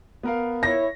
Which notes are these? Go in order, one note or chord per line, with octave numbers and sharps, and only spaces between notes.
B3 A#4 F5
E4 C#5 A#6